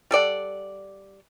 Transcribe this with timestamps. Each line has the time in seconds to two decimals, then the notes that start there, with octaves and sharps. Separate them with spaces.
0.11 G3 A4 D5 F#5